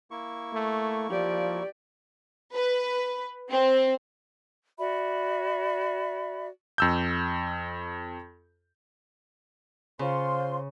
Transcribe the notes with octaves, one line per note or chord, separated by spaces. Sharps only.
A#3 E4 C#6
A3
F3 G4 D5
B4
C4
F#4 D5 E5 B5
F2 E6 G6
C#3 F4 C5 C6